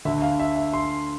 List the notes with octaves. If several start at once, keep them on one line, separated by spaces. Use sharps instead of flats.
D2 D3 E5
F5
E5
E5
C6